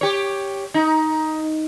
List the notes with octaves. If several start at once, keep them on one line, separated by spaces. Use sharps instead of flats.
G4 C#5
D#4